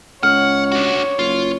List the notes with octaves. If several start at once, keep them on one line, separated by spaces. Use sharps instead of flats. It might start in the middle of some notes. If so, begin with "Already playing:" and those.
C#2 C#5 F#5 F6
D4 F#4
F#1 F4